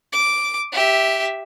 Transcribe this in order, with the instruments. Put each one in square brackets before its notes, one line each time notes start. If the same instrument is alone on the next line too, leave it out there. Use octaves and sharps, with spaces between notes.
[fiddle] D6
G4 E5